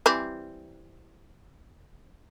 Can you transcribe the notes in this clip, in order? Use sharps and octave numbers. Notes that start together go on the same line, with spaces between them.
E3 G3 C4